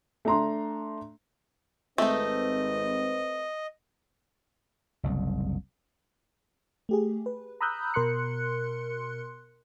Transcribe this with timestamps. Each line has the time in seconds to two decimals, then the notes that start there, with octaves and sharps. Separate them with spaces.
0.25 A3 D4 A#5 C6
1.98 G#1 A3 C4 D#4 B4 D#5
5.03 F#1 C2
6.89 A3 G4 G#4
7.26 B4
7.61 A#5 B5 D#6 E6 F#6 G6
7.94 B2 A#4 C6 F#6 C#7